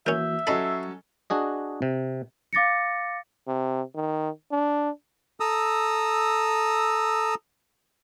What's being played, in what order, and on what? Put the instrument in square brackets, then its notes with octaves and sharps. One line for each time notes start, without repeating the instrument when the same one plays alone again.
[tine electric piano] E3 A#3 F#4 [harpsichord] C#4 A#4 [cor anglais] E5 [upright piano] G6
[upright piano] F#3 C#4 A4 [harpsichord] D#5 B5 [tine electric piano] C7
[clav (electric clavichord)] D4 F#4 G#4 D#5
C3
[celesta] F5 D6 A6 A#6 C#7
[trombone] C3
D#3
D4
[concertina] A4 A#5 D#6 E6